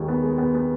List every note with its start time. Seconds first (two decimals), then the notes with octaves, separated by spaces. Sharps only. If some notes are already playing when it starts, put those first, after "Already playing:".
Already playing: D#2 D#3 G#3
0.08 B3
0.23 G#3
0.38 B3
0.55 B3